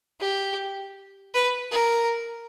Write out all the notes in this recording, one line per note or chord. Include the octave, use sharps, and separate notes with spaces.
G4
B4
A#4